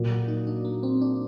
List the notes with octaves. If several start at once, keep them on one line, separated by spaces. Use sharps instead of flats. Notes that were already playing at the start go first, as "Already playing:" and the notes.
Already playing: A#2 F#3 A#3
F#4
D#4
D4
A#3
C4
D4